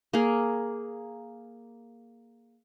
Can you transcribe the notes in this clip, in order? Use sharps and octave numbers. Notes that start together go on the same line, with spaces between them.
A#3 G#4